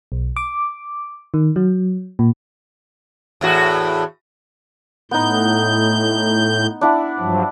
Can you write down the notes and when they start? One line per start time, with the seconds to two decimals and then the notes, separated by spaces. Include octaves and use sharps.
0.12 B1
0.36 D6
1.34 D#3
1.56 F#3
2.19 A#2
3.41 E2 A2 F#4
5.11 A2 B3 D#4 G6
6.81 D4 E4 F#5
7.19 G2 F3 F#3